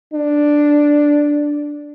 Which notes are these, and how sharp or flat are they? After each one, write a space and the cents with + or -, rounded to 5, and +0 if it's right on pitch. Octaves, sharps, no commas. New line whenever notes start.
D4 +0